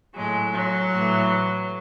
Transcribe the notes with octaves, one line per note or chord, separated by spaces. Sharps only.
A2 F#3 G#3
F#3
A2 E3